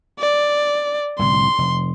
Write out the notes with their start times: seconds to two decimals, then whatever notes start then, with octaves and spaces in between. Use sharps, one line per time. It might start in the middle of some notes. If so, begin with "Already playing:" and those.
0.19 D5
1.19 C2 A2 D3 C6
1.58 F1